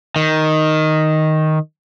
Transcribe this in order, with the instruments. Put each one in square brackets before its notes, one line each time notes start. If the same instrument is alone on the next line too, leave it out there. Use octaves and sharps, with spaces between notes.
[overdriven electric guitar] D#3